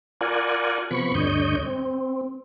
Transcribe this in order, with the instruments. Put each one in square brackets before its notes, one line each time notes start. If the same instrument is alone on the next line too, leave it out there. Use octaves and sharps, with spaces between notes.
[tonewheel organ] F4 A#4 D5 F#5 G#5
C3 F3 B3 B5 C#6
D2 G2 D3 C#5 D#5 G6
C4